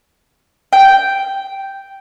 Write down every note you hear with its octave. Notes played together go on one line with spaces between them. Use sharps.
G5